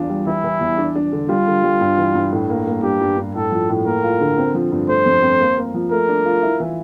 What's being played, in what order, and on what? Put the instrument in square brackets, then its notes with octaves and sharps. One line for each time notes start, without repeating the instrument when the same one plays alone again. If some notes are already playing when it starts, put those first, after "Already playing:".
Already playing: [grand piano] E2 D4 F4
G3
[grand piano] E3 [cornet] E4
[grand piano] E3
E2
D4
D4
D3
[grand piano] G3 [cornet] F4
[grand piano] D3
G3
G2
E3
G2
A2
A#3
A#3
[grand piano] G2 [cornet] G4
[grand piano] G2
G2
[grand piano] A2 [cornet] A4
[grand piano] F3
A2
[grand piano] A#3 [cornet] A#4
[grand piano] F4
D3
C4
F3
G2
[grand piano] A3 [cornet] C5
[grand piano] F2
C4
A#3
A#3
F3
[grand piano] A3 [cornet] A#4
[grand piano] D4
F4
E4
E3